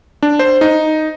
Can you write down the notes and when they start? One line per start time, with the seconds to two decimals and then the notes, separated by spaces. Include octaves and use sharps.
0.23 D4
0.39 C5
0.61 D#4